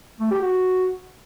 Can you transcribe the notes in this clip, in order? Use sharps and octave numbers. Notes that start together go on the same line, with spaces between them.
A3
G4
F#4